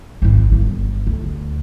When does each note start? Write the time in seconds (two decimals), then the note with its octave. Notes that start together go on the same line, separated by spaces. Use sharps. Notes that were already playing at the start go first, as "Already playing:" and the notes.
0.22 G#1 E4
0.52 G1
1.07 D2